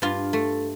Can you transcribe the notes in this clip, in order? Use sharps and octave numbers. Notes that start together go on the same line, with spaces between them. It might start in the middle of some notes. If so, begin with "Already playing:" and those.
G2 F4
A3